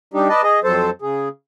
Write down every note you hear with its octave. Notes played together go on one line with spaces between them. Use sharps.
G3 D4 D#4 G4
B4 D5 D#5 A5
G#4 D#5
F2 F#3 A4 C5 A5
C#3 G#4